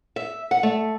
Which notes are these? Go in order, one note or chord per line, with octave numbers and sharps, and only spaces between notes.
E5
F#5
A3